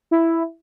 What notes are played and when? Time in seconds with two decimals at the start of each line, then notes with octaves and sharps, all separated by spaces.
0.11 E4